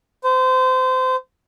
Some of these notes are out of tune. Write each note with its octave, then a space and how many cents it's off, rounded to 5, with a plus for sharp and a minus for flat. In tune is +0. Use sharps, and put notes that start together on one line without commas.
C5 -25